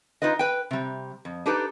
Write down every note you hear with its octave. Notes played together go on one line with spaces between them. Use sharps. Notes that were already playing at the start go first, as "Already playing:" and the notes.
D#4 F4 B4 D#5
B4 G5
C3 G3
F2
D4 D#4 G4 A4 B4 D5